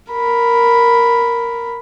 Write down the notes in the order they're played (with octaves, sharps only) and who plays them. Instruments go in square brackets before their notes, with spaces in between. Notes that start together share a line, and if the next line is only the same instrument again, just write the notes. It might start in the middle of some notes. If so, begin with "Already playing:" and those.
[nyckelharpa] A#4 B5